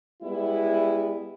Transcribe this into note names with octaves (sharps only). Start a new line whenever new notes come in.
G3 G#3 B3 E4